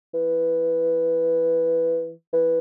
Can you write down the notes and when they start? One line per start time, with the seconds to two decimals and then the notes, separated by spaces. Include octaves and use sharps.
0.14 E3
2.33 E3